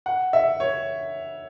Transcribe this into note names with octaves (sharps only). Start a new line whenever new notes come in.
F#5
E5
C#5